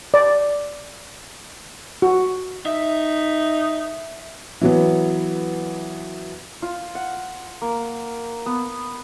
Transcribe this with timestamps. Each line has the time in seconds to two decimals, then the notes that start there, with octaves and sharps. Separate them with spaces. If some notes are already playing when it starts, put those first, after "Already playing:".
0.14 D5
2.02 F#4
2.66 D#4 E5
4.61 E3 F#3 B3
6.62 F4
6.95 F#5
7.62 A#3
8.46 B3